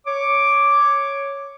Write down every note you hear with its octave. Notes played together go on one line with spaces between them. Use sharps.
C#5 D6